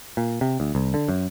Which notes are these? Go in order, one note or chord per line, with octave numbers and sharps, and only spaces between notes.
A#2
C3
D2
C2
D3
F#2